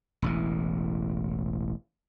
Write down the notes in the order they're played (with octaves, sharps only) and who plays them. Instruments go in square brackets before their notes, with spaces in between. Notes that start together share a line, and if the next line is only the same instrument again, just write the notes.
[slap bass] E1 A1 E3